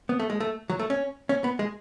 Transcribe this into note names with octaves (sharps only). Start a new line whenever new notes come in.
B3
A3
G#3
A3
F#3
A3
C#4
C#4
B3
G#3